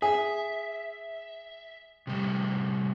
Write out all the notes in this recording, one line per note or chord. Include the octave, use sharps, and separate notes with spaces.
G#4 E5
C3 G3 A3